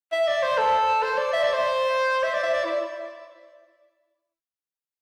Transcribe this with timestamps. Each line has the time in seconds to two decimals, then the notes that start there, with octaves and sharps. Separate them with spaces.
0.12 E5
0.28 D5
0.43 C5
0.58 A4
1.03 C5
1.18 D5
1.33 E5
1.43 D5
1.53 C5
2.23 E5
2.34 D5
2.43 E5
2.53 D5
2.65 E4